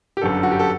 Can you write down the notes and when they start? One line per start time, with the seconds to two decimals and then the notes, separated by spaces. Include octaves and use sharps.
0.17 G4
0.21 G1 F#2 D3 A4
0.43 F#4
0.51 G4
0.59 A4